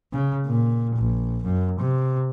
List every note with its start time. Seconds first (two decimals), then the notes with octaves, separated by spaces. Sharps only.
0.13 C#3
0.46 A#2
0.96 A#1
1.44 F#2
1.79 C3